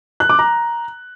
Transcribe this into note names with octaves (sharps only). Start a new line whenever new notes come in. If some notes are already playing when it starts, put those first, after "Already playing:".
F#6
D6
A#5